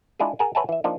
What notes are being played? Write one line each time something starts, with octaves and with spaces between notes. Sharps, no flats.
G#3 D4 E4 F4 G#4
G#4 A#4 F#5 G#5
B4 C#5 E5 F#5 G#5 A5
E3 E5
F3 A#3 D4 D#4